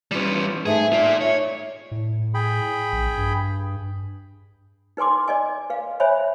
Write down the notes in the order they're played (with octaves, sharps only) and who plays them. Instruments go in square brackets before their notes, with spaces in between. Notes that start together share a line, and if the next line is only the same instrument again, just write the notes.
[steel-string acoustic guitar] E3 B4 [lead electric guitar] G3 C#4 [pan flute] F4
[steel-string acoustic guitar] G#2 A3 D#4 [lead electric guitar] G#4 [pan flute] E5
[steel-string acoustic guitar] D#4 [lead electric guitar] F4 D5
[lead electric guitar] C#5
[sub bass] A2
[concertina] G#4 G5 B5
[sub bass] A#1
G2
[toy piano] D#4 B4 G#5 C6 D6
D5 D#5 G#5
B4 F5
C5 C#5 E5 G#5 B5